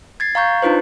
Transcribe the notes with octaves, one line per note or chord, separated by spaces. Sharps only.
G#6 A6 C7
F5 A#5 C#6 G6
D4 D#4 F4 B4 C5